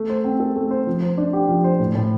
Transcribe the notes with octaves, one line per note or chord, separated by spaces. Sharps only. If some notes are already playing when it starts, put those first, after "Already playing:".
Already playing: A3
C5
C4
A4
A3
C5
F3
C5
D4
G4
F3
C5
A2
A2